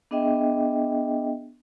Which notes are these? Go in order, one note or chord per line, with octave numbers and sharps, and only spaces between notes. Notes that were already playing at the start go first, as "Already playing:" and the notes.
B3 D4 G#4 D#5 E5 G5